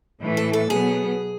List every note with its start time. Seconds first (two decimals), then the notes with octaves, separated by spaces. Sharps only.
0.22 A2 E3 A3
0.37 A4
0.53 A4
0.70 B2 F#3 B3 G#4